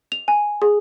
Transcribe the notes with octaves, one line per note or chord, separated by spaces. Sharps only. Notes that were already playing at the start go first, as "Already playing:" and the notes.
F7
G#5
G#4